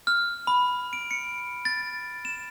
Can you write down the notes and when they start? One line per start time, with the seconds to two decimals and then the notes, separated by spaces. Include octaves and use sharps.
0.07 F6
0.47 B5
0.93 D7
1.11 C#7
1.65 A6
2.25 E7